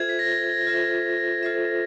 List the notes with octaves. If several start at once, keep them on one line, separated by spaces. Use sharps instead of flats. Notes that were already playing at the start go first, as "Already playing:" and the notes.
Already playing: F4 A4 C5 E5 G#6
B6
A#6
A6
F4 A4 C5 E5
F4 A4 C5 E5